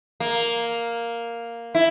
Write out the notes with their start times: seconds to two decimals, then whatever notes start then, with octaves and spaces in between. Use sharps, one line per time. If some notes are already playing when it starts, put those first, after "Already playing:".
0.20 A#3
1.75 E4